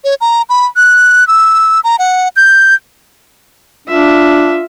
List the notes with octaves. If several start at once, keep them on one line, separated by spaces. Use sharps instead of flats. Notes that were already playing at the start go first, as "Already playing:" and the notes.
C#5
A#5
B5
F#6
E6
A#5
F#5
G6
D4 F4 E5